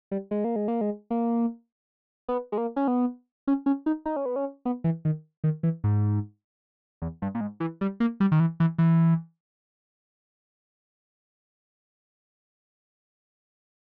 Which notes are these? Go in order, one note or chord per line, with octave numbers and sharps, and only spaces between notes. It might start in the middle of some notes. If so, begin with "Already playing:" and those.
G3
G#3
A#3
G#3
A#3
G#3
A#3
B3
G#3
A#3
C#4
B3
C#4
C#4
D#4
D#4
C#4
B3
C#4
B3
E3
D#3
D#3
E3
G#2
E2
G2
A#2
G#2
E3
G3
A#3
G3
D#3
E3
E3
E3